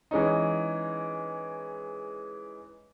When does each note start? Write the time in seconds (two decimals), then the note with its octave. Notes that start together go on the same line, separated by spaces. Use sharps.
0.11 E3 G#3 C#4 D#4